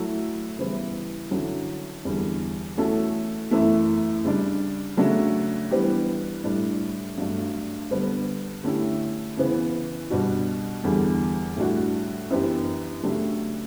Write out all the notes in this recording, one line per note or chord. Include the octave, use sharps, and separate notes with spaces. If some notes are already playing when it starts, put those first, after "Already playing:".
Already playing: F#3 A3 E4 A4
C#3 E3 G3 B3 E4
D3 F#3 C#4 E4
E2 D3 G3
E3 A3 C#4 F#4 A4
F#2 E3 A3 E4
C#3 G3 D4
C#3 F#3 A3 D4
E3 G3 B3 D4 G4
A2 G3 D4
G2 F#3 A3 D4
D3 G3 B3 D4
D3 A3 C#4 E4 G4
C#3 E3 B3
B2 G3 D4 F#4
E2 D3 G3
A2 G3 D4 F#4
F#2 E3 B3 D4 G4
C#3 F#3 A3 D4 G4